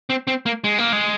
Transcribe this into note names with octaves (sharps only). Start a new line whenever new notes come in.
C4
C4
A#3
G#3
A#3
G#3